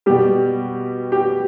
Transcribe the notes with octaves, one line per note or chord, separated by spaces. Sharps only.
B2 G3 G4
G4